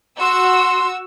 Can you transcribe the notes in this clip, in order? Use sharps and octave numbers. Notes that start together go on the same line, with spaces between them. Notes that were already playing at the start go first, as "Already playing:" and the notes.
F#4 C6 E6